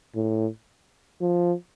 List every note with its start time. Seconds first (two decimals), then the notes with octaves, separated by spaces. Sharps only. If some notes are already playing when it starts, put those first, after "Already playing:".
0.15 A2
1.21 F3